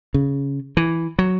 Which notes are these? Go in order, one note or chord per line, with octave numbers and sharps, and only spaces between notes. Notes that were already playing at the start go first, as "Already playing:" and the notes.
C#3
E3
F#3